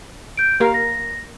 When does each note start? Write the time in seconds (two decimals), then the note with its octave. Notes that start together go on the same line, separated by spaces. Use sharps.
0.37 G6 D7
0.60 A#3 G4 A#4 F5
0.74 A#6